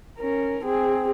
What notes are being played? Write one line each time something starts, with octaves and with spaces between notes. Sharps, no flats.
C#4 A#4
C4 G#4